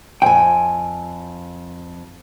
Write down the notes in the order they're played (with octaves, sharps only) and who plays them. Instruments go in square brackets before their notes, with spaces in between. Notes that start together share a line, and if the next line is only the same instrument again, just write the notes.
[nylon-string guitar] F2 G#5 [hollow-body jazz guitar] G5